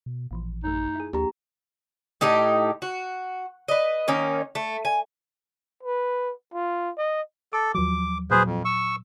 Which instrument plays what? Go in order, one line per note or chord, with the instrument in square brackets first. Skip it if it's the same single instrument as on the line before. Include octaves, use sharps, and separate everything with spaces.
[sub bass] B2
[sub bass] A1 [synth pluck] A#2 E3 F3
[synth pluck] F#2 A3 [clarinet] D#4
[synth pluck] E4 G#4
[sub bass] D#2 [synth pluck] F3 A#3 D4 [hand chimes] G4 A#5
[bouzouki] A2 D#4 G4 D#5
F#4
B4 D#5
D#3 A#3 C#4 D#4
A3
G#5
[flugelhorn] B4
F4
D#5
[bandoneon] A4 [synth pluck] D6
[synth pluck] D#2 F3 F#3 [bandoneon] D6
[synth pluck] A#2 F#3 [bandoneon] G#4 B4 C5
[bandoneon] F2
C#6 E6